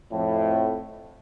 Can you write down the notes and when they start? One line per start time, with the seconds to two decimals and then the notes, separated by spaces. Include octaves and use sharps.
0.12 F2 A2